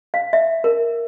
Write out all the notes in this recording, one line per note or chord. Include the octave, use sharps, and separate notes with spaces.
F5
E5
A#4